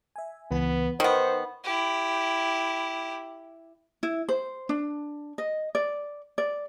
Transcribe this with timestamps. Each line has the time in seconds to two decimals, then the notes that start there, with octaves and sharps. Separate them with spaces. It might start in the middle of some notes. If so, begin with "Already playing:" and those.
0.16 E5 G#5
0.51 C#2 E3 B3 B4
1.00 D#3 B3 D#4 C5 C#7
1.64 E4 G4
4.03 E4
4.29 C5
4.69 D4
5.38 D#5
5.75 D5
6.38 D5